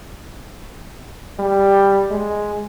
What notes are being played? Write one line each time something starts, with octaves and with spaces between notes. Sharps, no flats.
G3
G#3